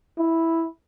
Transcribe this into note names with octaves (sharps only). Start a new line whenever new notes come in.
E4